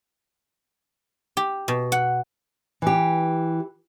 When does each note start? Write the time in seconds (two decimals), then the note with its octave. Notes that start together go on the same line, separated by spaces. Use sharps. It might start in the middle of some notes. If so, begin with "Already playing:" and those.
1.37 G4
1.68 B2
1.92 F#5
2.82 E3 G4